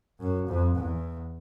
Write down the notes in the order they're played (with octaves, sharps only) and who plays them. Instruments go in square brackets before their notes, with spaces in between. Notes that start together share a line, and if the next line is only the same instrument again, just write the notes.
[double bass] F#2
F2
E2